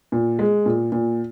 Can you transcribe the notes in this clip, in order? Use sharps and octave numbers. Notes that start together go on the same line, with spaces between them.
A#2
G#3
A#2
A#2